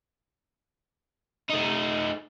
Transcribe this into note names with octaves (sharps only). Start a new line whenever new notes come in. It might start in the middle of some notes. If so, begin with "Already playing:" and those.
A3 D#4